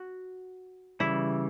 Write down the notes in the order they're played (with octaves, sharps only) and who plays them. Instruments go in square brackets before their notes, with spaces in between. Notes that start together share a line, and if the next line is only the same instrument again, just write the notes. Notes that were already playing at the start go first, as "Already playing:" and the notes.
Already playing: [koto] F#4
[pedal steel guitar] C#3 E3 G3 [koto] E4